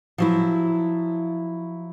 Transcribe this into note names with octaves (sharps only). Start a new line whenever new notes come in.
F3 F#3 E4